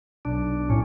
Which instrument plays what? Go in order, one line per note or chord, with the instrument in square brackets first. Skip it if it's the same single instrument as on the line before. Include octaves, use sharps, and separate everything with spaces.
[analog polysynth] B1 [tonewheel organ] D4
[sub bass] A2 [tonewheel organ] C#4